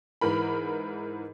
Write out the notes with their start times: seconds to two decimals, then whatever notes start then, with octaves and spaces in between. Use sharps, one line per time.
0.21 G#2 E3 A#4 B5